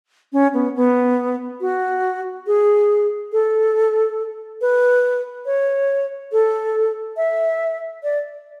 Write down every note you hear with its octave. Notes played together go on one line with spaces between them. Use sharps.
C#4
B3
B3
F#4
G#4
A4
B4
C#5
A4
E5
D5